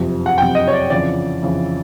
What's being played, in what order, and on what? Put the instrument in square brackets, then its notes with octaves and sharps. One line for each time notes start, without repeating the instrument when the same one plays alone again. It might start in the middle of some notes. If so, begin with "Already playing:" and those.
Already playing: [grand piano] F#1 F2 C3
F#5
F#1 F2 C3 G5
D#5
C#5
D5
F2 C#3 E3 D5
F2 C#3 E3